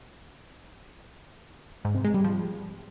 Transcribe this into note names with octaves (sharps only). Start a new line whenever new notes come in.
G#2
C3
G#3
G3
F3